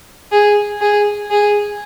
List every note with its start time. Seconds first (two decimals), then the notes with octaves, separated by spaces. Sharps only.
0.32 G#4
0.81 G#4
1.31 G#4